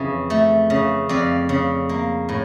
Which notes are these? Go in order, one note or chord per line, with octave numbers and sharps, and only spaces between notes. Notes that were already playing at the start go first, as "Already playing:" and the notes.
Already playing: F2 C#3 E3
A3
C#3
F2 D5 F5
C#3
A#3
A2